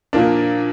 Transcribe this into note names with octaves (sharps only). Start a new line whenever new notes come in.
A#2 F3 A#3 D4